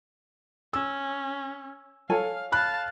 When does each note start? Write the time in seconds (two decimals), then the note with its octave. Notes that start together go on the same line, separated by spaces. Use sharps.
0.73 C#4 E6
2.10 A4 C#5 F5 G#5
2.52 F5 A5 B5 F#6